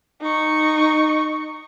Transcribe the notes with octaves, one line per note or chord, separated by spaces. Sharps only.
D#4 C#6